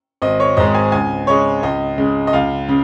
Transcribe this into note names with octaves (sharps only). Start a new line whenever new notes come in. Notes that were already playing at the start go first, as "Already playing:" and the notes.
G#1 D#5
C#5
G#2 G#3 D#5
G#5
C#2 G#5
C#3 G#3 C#5
C#2 D#5
C#3 G#3
D#5
C#2 F5
C#3